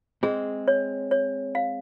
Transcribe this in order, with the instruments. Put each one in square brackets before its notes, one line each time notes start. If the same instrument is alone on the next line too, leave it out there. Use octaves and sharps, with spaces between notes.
[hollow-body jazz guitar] G#3 C4 [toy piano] G#4
[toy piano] C#5
C#5
F5